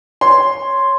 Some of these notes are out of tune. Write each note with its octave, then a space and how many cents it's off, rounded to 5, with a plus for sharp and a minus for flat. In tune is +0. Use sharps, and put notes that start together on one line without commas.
C#5 +0 C6 +0